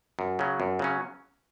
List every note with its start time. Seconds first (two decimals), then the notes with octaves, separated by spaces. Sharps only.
0.19 F#2
0.39 C#3 F#3 C#4
0.60 F#2
0.79 C#3 F#3 C#4